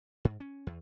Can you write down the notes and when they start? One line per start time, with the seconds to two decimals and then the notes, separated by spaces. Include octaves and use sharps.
0.25 G#2
0.40 C#4
0.67 E2